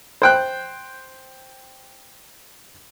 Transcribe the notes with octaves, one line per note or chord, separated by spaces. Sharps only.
C5 G5 F#6